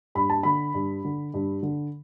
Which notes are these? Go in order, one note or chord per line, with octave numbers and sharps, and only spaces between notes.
G2 B5
A5
D3 B5
G2
D3
G2
D3